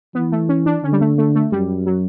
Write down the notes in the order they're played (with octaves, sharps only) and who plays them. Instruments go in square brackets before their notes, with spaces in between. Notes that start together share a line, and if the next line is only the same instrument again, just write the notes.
[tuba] E3 [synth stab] B3
[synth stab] A3
C#4
D4
[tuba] D3 [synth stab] C#4
[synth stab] G3
A3
A3
A3
[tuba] F#2 [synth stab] G3
[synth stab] F#3